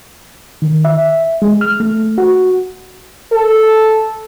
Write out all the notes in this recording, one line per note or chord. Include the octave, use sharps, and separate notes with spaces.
D#3
E5
G#3
F6
A3
F#4
A4